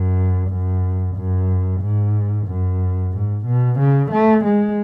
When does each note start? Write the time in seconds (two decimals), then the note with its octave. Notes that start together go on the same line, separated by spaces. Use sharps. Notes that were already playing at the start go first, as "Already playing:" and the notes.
Already playing: F#2
0.50 F#2
1.16 F#2
1.81 G#2
2.47 F#2
3.13 G#2
3.46 B2
3.79 C#3
4.12 A3
4.45 G#3